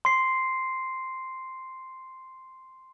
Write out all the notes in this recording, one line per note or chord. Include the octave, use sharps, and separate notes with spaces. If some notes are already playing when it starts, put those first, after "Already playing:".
C6 C7